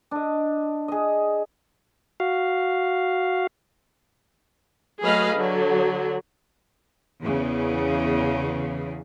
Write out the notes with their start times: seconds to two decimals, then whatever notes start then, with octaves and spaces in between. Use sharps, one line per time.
0.11 D4 D#5
0.88 G#4 D#5
2.20 F#4 F5
5.02 F#3 A3 G#4 B4 D#5 F5
5.36 D3 F#3
7.23 E2 C#3